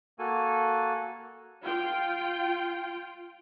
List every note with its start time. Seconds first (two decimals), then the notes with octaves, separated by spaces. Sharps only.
0.19 A#3 F#4 A4 G#5
1.63 F4 G5